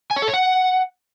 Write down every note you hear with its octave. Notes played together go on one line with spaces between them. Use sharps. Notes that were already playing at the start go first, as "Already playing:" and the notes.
G#5
C#5
A4
C#5
F#5